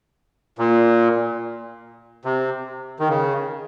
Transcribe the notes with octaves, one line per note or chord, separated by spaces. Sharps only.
A#2
C3
D#3
C#3